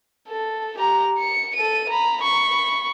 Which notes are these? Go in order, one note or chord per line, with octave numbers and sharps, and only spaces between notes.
A4
G4 A#5
C#7
A4 D#7
A#5 B5
B5 C#6